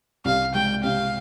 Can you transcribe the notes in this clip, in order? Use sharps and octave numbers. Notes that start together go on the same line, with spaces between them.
C2 F5
G#3 G5
C3 F5